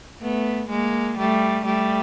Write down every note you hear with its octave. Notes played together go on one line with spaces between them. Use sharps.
A3 B3
G#3 A#3
G3 A3
G3 A3